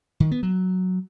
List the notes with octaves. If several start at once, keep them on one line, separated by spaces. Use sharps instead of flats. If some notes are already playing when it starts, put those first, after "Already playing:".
D#3
B3
F#3